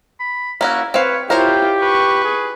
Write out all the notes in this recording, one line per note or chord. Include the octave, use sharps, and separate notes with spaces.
B5
A#3 C#4 E4 F#4
C4 B4 C#5 F5
E4 F4 G4 A#4 C5 C#5 G5
B4 C#6
G#4